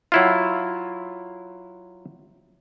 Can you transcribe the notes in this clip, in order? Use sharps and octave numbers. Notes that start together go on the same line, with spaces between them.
F#3 E4 F4